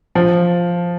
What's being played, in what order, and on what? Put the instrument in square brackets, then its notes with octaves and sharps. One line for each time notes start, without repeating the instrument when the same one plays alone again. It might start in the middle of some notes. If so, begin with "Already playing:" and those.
[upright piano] F3